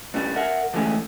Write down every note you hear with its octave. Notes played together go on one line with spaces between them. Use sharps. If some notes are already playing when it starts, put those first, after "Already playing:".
G2 C#3 G3
A#4 E5 F#5
D3 E3 G#3 A3 C#4 G#4